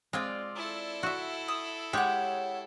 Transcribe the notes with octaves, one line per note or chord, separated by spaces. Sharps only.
G#3 C4 F4 D5
E4 A4
F#4 E5
D#6
G#3 G4 C#5 F#5